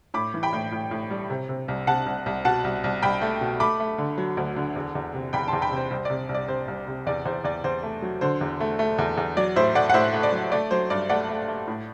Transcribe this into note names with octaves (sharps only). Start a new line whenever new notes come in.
A2 B5 D6
E3
G5 B5
A2
A2
A2
G3
C3
C3
C2
C3 F#5 A5
C2
C2
B2 F#5 A5
C2
C2
C2 G5 B5
A3
B2
A3 B5 D6
A3
D3
F#3
D2
D3
E2
E2
C3
E2 G5 B5
E2 A5 C6
G5 B5
C3
C5
C2 C5
C3 D5
C2
D5
C3 C5
C2
C3
E2 D5
E2 C5
E2 D5
E2 C5
A3
F#3
D3 C5
E2
A3
A3
E2
E2
F#3 D5
A2 C5 E5
A3 D5 F#5
F#5
A2 C5 E5
A3
D5
F#3
A3 D5
F#3 C5
G2 D5
A3 D5 F#5
A3
A3
A2